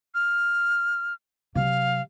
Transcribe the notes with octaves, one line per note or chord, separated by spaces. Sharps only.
F6
C3 F#3 F5